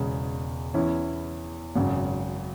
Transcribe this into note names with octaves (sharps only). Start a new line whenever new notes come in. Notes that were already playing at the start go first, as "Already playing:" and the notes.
Already playing: E1 E2 C#3 G#3
E2 E3 C#4 E4
G#1 F#2 C#3